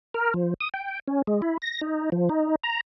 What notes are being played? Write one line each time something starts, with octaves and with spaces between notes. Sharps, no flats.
A#4
F3
D#6
G5
C#4
G#3
E4
A#6
D#4
F3
D#4
A#5